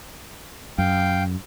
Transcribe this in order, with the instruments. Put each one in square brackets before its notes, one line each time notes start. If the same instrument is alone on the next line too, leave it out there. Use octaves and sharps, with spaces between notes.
[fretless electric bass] F#2 [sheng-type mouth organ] F5 G5